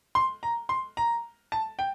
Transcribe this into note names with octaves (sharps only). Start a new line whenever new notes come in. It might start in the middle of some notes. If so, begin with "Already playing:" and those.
C6
A#5
C6
A#5
A5
G5